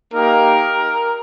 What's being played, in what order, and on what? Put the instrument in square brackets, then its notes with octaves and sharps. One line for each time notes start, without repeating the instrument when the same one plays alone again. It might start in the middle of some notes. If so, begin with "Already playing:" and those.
[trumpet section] A#3 D#4 G4 A#4